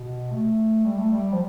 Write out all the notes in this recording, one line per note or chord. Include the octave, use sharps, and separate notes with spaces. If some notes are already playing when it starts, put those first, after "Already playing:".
Already playing: B2
A3
G3
A3
G3
F3